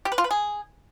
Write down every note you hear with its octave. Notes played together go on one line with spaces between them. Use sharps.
G4
B4
F4
B4
G#4